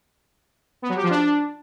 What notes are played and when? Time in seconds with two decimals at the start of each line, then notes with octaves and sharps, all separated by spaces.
0.82 B3
0.89 F#3
0.96 G4
1.03 F3
1.10 D4